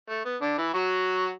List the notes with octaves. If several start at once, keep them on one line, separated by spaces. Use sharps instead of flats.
A3
B3
D3 D4
E3 E4
F#3 F#4